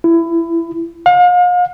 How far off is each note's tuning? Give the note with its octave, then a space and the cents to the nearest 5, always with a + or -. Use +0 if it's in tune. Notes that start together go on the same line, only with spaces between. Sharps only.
E4 +20
F5 +40